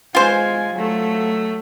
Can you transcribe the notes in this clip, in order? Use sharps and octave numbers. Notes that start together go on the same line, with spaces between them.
G#3 F4 C5 G#5
F#3 A3